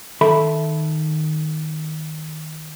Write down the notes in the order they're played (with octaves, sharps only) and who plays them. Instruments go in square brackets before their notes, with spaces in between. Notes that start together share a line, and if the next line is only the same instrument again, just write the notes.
[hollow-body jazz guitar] D#3 A4 E5 B5